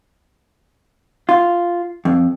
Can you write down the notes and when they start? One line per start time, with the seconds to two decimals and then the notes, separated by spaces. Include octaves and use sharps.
1.29 F4
2.05 F2